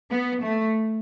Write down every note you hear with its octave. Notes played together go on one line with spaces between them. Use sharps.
B3
A3